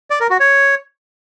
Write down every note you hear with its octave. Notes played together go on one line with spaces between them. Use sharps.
D5
A#4
F#4
C#5